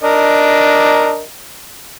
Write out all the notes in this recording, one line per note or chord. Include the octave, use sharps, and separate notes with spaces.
D4 A#4 D#5